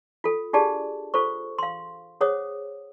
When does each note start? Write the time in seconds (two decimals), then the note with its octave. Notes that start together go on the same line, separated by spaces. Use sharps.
0.24 F4 A4
0.53 D4 F4 G4 G#4 D5 A5
1.14 F4 A4 C5 C#6
1.59 F5 C6
2.21 G#4 C5 C#5 F#5 D#6